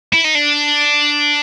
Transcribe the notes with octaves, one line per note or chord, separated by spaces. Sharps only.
E4
D#4
D4